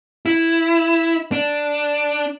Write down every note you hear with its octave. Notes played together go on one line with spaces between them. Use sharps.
E4
D4